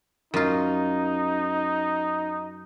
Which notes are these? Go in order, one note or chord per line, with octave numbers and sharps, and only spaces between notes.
F#2 D#4 F4